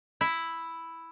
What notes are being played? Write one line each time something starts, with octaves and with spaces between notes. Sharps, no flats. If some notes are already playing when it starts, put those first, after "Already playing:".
E4